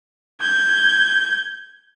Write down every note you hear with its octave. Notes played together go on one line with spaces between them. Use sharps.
G6 G#6